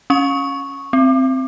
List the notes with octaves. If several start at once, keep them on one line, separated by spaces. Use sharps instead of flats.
C#4 C#6
C4